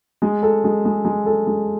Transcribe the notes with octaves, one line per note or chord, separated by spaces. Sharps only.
G#3
A4
G#3
G#3
G#3
A4
G#3